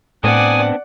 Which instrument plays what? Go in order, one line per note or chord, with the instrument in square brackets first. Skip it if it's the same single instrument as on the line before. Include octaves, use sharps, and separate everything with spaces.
[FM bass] A2 [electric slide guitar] B3 C4 D4 [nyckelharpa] D5 F#5 [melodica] G#5 D#6